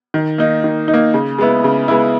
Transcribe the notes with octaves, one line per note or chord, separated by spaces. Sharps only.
D#3
A#3 D#4
D#3
D#4
A#3
C#3
G#3 B3 E4
C#3
G#3 B3 E4